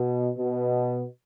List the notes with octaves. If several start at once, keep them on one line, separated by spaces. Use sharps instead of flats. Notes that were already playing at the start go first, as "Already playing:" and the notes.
Already playing: B2
B2